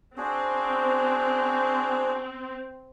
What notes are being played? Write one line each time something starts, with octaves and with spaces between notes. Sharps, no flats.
C4 D4 F#4 G#4